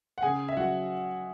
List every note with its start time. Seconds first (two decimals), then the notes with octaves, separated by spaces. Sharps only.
0.18 F#5
0.22 C#3 G#4 G#5
0.48 E5
0.57 F#3 F#4 F#5